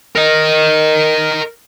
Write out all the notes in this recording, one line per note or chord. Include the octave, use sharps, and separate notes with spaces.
A#4 D#5